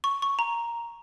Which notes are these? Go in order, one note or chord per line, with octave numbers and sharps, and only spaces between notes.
C#6
C#6
A#5